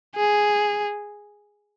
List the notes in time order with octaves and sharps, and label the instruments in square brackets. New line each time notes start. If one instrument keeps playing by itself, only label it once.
[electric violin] G#4